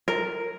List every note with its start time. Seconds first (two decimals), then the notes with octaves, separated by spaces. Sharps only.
0.08 A#4